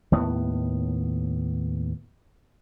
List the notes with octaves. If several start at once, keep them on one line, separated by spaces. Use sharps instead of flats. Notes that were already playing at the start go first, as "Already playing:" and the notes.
D#2 A2 B3